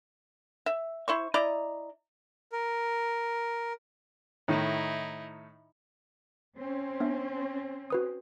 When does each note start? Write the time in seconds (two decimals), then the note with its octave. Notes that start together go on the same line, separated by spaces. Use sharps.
0.66 E5
1.08 E4 C5 C#6
1.34 E4 D5 D#5 A#5
2.52 A#4
4.48 A2 D#3 D#4 E4
6.57 C4 C#4
7.00 B3 D4 E5
7.90 F#4 B4 D#6